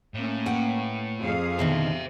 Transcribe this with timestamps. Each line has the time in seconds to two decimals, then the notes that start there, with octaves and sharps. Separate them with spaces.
0.14 A2 A#3 C#4
0.46 B4 F#5 G5
1.21 F2 G#4 F5
1.59 B2 D3 D#3 C5 E5